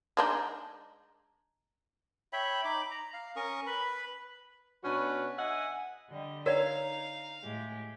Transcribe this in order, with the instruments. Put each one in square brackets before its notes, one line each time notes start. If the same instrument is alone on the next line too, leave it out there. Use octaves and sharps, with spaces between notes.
[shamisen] G#3 D4 D#4
[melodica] C#5 E5 G5 B5
D#4 B5 D6
A#5
F5
C#4 A#4 C#6 D#6
B4 B5
[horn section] B2 C#4 D4 F#4 B4
D#5 E5 F#5 G#5
[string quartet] D3 G3 D#5
[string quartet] D#4 A#5 [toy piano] A#4 D5 [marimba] C#5 [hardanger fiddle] F5
[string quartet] A2 G#3 G4